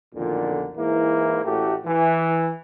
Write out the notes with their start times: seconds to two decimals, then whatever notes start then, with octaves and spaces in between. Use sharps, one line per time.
0.15 B1 F2 A#2 D3 D#3
0.77 G#2 E3 A#3 E4
1.45 A1 A2 A3 F#4 G4
1.86 E3